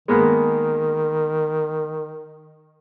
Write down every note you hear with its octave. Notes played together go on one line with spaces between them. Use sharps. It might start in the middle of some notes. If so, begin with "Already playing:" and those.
D#3 G#3 A#3 B3